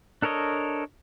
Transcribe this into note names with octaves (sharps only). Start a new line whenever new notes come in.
D4 A4 A#4 C#5 D#5